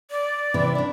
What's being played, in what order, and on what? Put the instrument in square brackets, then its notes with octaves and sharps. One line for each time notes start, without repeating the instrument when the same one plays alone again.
[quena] D5
[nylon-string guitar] C3 E3
D4 E4